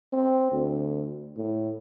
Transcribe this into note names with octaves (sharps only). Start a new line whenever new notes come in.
C4
D2
A2